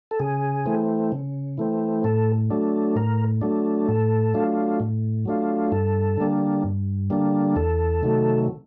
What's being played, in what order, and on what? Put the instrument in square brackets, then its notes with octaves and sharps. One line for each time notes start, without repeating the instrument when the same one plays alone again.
[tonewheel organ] A4
C#3 G#4
E3 A3 C4
C#3
E3 A3 C4
A2 A4
F#3 A3 D4
A2 A#4
F#3 A3 D4
A2 A4
F#3 A3 D4 F4
A2
F#3 A3 D4 F4
G2 A4
D3 G3 A#3 D4
G2
D3 G3 A#3 D4
E2 A4
C3 D#3 F#3 A3